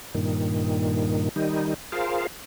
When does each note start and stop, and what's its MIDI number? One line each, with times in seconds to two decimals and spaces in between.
0.15 1.29 43
0.15 1.29 46
0.15 1.29 51
1.36 1.74 51
1.36 1.74 55
1.36 1.74 63
1.92 2.27 65
1.92 2.27 68
1.92 2.27 70
1.92 2.27 72
1.92 2.27 77